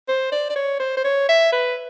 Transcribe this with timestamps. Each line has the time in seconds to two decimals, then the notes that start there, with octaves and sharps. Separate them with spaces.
0.08 C5
0.32 D5
0.50 D5
0.56 C#5
0.80 C5
0.97 C5
1.04 C#5
1.29 E5
1.52 B4